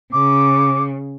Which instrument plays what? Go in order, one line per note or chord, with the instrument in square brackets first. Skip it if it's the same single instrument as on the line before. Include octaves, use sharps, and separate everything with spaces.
[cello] C#3 [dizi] D6